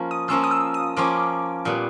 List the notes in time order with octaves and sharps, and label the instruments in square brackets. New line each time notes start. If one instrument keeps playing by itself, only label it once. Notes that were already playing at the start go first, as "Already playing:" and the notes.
Already playing: [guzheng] F3 A#3 C#4 F4
[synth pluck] D#6
[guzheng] F3 A#3 C#4 F4 [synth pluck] E6
[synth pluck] D#6
E6
D#6
[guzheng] F3 A#3 C#4 F4 [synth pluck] D6
[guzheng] A#2 G3 B3